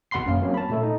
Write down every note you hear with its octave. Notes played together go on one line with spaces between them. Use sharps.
G#1 B2 F#5 B5 C6 C7
F#2 A#3 C#4 F5
F#3 A#3 C4 C#4
A5 B5
A#2 A3 A4
D#4